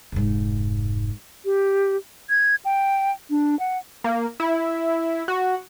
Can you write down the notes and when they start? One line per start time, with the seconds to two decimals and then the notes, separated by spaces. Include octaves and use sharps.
0.12 F1 G#2
1.45 G4
2.30 G#6
2.65 G5
3.30 D4
3.59 F#5
4.04 A#3
4.40 E4
5.28 F#4